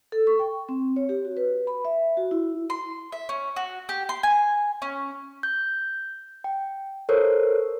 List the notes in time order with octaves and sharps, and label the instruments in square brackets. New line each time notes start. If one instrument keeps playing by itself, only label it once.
[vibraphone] A4
C#6
G5
C4
C#5
G4
F#4
B4
B5
E5
F#4
E4
[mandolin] C6
E5
C#4
F#4
G4
C6
G#5
C#4
[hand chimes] G6
G5
A4 A#4 C5 C#5